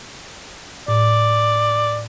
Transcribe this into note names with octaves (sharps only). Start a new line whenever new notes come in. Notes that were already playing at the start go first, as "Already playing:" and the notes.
A2 D5